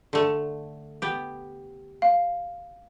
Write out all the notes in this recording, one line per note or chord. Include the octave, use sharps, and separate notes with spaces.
D3 A3
B3 G4
F5